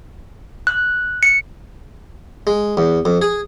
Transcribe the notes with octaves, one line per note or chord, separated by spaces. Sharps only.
F#6
C#7
G#3
E2
F2
G#4